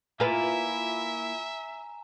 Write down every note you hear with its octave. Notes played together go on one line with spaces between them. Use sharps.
A#3 E4 F4 B4 E5 G#5 A#5 E7